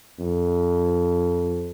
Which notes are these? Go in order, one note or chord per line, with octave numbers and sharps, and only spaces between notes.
F2